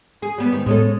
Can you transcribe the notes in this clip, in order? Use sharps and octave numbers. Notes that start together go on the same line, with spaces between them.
G#4
G3 B3
G#2 D#3
A2 G#3 B3 C#4 A4